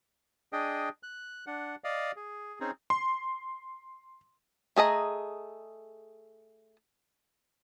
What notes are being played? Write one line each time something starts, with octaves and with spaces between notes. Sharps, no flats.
D4 G#4 D#5 G5
F#6
D4 F#5
D5 D#5 F5
G#4
C4 C#4 D#4 G#4
C6
A3 G#4 D#5 A#5